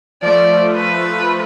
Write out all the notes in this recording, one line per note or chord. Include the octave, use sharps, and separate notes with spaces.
F3 A3 D5
B4